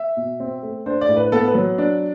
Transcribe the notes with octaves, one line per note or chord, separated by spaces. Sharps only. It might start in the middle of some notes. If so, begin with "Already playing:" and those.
Already playing: E5
B2
C4
A3
D4 C5
D5
A2
B4
B3 A4
B4
F#3
D4